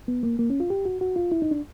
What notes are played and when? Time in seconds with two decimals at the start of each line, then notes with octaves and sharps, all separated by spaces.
0.08 B3
0.23 A#3
0.39 A#3
0.50 C#4
0.60 F4
0.70 G4
0.85 F#4
1.01 F#4
1.16 F4
1.32 E4
1.42 D#4
1.51 D4